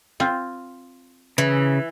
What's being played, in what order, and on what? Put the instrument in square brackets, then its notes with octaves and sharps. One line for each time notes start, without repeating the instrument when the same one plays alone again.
[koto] C4 F4
[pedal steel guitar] C#3 [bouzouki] E3